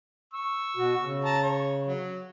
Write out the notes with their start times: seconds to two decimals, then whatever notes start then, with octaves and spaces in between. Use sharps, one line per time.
0.33 C#6 E6
0.77 B2 F#4
1.01 C#3
1.25 A5 A#5
1.43 C#5
1.86 F#3